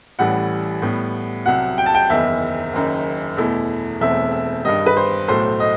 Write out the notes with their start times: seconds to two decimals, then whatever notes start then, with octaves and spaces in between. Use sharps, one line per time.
0.19 A1 A2 E3 G3 F#5
0.82 A2 G3 B3
1.46 C2 C3 F#3 F#5
1.78 G5
1.86 A5
1.95 G5
2.09 F#1 E2 D#3 E5
2.73 F#1 F#2 D#3
3.37 E2 B2 A3 E4
4.00 E1 E2 B2 A3 C4 E5
4.32 E5
4.65 G2 D#3 G3 D#5
4.86 B4
4.97 C5
5.28 B1 A2 F#3 A3 C5
5.60 D#5